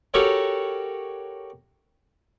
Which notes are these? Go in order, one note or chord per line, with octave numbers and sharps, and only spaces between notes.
F#4 G4 A4 A#4 C#5 G#5